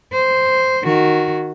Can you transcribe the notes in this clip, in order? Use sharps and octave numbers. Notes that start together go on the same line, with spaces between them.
C5
D#3 F#4